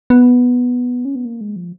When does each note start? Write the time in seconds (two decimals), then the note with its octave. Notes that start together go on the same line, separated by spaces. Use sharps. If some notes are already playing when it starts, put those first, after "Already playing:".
0.10 B3
1.05 C#4
1.15 B3
1.25 A#3
1.41 G#3
1.56 F3